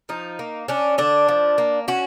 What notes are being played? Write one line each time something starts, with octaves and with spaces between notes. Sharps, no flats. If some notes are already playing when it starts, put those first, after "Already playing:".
F3 D#4
A#3
C#4 D4
D3 D4
F3
A#3
C#4 F#4